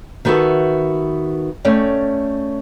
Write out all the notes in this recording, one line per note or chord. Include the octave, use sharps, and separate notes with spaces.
D#3 B3 F#4 A4 B4 E5
A3 C#4 C#5 D5 G5